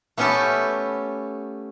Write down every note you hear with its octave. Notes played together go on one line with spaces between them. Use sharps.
A3 B3 C#4 G4 A4